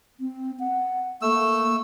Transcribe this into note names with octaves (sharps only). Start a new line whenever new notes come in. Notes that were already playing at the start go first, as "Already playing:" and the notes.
C4
F#5
A3 A#3 E6